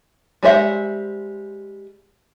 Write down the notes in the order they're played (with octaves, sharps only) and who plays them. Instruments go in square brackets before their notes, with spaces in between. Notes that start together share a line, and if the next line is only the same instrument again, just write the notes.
[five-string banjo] G3 G#3 C5 E5 F#5